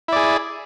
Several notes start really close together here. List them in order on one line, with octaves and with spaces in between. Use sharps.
E4 D5 G#4